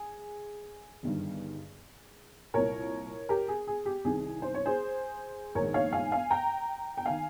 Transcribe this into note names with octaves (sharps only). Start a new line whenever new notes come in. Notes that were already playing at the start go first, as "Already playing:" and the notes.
Already playing: G#4
G1 G2 D#3
C2 A#2 A#4 C#5
G4 A#4
G#4
G#4
G4
C2 C3 D#3 G#4
C5
C#5
G#4 C5
A#1 G#2 D#3 A#4 C#5
C#5 F5
F5 G#5
F5 G#5
G5 A#5
G5
D#3 F5 G#5